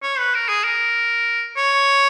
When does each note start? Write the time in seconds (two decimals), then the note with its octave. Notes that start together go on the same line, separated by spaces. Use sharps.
0.03 C#5
0.19 B4
0.35 A#4
0.49 G#4
0.64 A#4
1.57 C#5